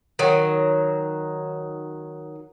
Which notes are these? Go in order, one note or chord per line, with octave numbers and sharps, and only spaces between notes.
D#3 F#3